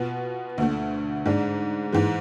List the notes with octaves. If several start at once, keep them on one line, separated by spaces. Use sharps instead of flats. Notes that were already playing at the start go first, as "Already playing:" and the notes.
Already playing: B2 B3 F4
D2 D3 A3
G#2 G#3 D4
G#2 E3 G#3